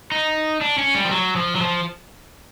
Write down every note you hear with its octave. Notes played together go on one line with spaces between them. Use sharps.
D#4
D4
C#4
G3
F3
F#3
F3
F#3
F3